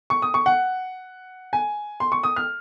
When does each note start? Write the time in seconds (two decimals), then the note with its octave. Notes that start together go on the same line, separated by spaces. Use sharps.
0.10 C#6
0.22 D#6
0.34 C#6
0.46 F#5
1.53 G#5
2.00 C6
2.12 C#6
2.23 D#6
2.36 F6